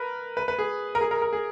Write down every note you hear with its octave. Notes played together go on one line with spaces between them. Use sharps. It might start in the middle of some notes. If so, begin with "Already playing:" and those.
Already playing: A#4 B4
B4
B4
G#4
A#4
G#4
A#4
A#4
G#4